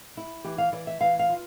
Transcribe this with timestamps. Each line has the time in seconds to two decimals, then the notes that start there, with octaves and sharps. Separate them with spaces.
0.17 E4
0.44 E3 G4
0.58 F5
0.73 E3 D5
0.87 E5
1.01 E3 F5
1.19 F5
1.29 F4